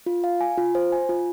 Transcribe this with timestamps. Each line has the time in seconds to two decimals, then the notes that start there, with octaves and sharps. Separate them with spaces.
0.06 F4
0.24 F5
0.41 G#5
0.58 F4
0.75 C5
0.92 G#5
1.09 F4